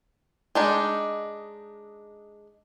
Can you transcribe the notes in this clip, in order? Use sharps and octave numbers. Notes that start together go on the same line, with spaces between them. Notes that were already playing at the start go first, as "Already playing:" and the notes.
G#3 D4 D#4